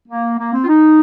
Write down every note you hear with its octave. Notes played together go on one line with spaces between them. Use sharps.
A#3
A#3
C4
F4
D#4